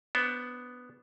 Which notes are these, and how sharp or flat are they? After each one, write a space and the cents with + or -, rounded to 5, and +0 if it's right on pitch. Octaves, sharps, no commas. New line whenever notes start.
B3 +5 D4 -10 C5 +25